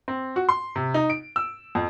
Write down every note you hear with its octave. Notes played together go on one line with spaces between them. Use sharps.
C4
F#4
C6
C3
D#4
D7
E6
F2